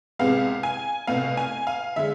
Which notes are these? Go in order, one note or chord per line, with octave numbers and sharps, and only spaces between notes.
C2 C3 G#3 B3 F5
G#5
C2 B2 A3 F5
G#5
F5
D3 G#3 E5